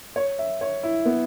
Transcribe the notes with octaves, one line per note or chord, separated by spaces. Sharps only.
C#5
E5
C#5
E4
B3